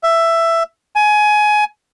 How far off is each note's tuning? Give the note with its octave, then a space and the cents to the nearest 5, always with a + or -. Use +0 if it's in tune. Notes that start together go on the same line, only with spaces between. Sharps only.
E5 +10
G#5 +20